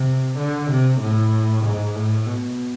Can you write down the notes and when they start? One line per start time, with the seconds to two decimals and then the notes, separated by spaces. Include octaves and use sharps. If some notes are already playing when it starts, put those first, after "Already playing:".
Already playing: C3
0.38 D3
0.71 C3
1.01 A2
1.64 G#2
1.96 A2
2.26 B2